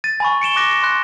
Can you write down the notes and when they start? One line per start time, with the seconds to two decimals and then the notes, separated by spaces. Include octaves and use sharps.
0.04 A6 D#7
0.20 G#5 B5 C#6
0.42 C#7 D7 E7 G7
0.56 D6 F#6 A#6 D7 E7
0.83 C6 F#6